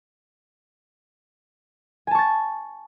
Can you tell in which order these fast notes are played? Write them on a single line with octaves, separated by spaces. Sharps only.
G#5 A5 C#6 A6